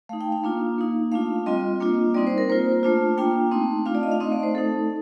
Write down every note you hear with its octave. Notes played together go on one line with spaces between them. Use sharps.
A3 D#4 F5
G5
F5
A#3 D4 F4
A#3 D#4
A3 D4 F4 F5
G3 C4 F4 D#5
A#3 D4 F4
G3 C4 D#4 D5
C5
A#4
A#3 F4 C5
A3 D4 F4
A#3 D4 F4 G5
A3 C4 D#4
A3 D4 F4 F5
D5
D#5
F5
A3 C4 D#4 D#5
D5
C5
A3 D#4 A4